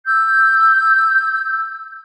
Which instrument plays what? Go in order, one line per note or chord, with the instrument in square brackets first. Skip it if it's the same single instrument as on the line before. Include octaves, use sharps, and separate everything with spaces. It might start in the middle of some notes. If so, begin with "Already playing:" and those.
[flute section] E6 G6